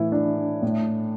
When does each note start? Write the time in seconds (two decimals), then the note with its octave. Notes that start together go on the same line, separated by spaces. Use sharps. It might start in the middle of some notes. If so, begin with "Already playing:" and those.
Already playing: A2 E3 E4
0.12 D4
0.62 A2